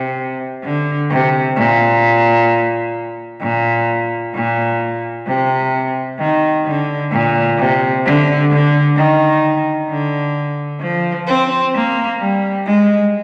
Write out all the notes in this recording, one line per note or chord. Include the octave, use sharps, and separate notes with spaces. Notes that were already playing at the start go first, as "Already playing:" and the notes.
Already playing: C3
D3
C3
A#2
A#2
A#2
C3
D#3
D3
A#2
C3
D3
D3
D#3
D3
F3
C4
A#3
G3
G#3